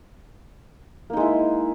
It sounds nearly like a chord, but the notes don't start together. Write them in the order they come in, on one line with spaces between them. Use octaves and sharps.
A#3 D#4 G#3 E4